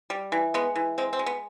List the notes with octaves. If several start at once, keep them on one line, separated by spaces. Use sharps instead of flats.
G3
E3
G#3 B3
E3
G#3 C4
C4
G#3
B3